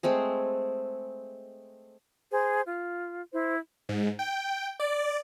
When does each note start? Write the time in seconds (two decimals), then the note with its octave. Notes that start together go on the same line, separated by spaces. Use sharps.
0.03 G#3 A3 C4 G#4
2.32 G#4 C5
2.64 F4
3.33 E4 C5
3.89 G#2
4.19 G5
4.80 D5